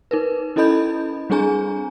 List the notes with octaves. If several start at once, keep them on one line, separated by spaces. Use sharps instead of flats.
D#4 A#4 B4
C#4 E4 A4 D#5 B5 G6
G3 C4 D4 G#4 G#5 A#5